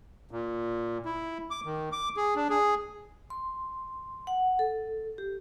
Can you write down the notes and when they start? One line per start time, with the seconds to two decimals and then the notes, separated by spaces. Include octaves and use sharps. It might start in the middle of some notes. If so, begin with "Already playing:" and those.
0.31 A#2
1.05 E4
1.51 D6
1.65 D#3
1.92 D6
2.17 G#4
2.36 D4
2.50 G#4
3.30 C6
4.27 F#5
4.59 A4
5.18 G4